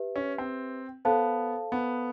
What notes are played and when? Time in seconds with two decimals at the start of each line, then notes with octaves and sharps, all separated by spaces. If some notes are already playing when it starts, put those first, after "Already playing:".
Already playing: G4 B4 E5
0.16 C#4
0.38 C4
1.05 B3 A4 C5 F5 A5
1.72 B3